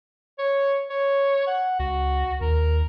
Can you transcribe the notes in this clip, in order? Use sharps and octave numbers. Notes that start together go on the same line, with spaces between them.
C#5
C#5
F#5
C#2 F#4
D#2 A#4